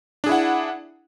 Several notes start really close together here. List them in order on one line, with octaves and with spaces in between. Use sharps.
D4 G#4 E4 F#5